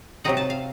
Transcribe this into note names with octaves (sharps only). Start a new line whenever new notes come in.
C3 F#3 C4 D#4 F#5
A5
F5